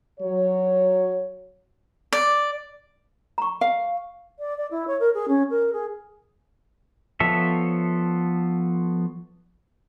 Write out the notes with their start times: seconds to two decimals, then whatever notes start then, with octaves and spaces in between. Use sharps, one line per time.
0.20 F#3 C#5
2.12 D5
3.38 A#5 C#6
3.61 F5
4.39 D5
4.58 D5
4.71 E4
4.88 C#5
5.00 A#4
5.14 G#4
5.28 C#4
5.50 A#4
5.73 G#4
7.20 F3 B3 A4 C#5 E5